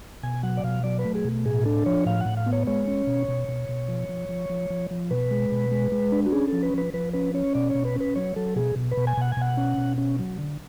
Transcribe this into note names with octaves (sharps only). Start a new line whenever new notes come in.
B2 G#5
F#3 F#5
D5
B2 F5
F#3 D5
B4
A3
G#4
B2
A2 G#4
D4 A4
F3 C#5
A2 F5
F#5
A2
F5
B3
C#5
G#3 C#5
C#4
B2
B2
B2
B2
F3
F3
F3
F3
F3
F3
B2 B4
G#3
B2
G#3
G#3
D4
F#4
C#4 G#4
F3 A4
B4
F3 B4
F3 B4
C#4 B4
C#4 C#5
B2 D5
B2 C#5
B4
C#4 B4
F#3 C#5
F#3 A4
B2 G#4
B2
B4
B2
G#5
B2 F#5
G#5
B2 F#5
C#4
B2
C#4
F#3
D3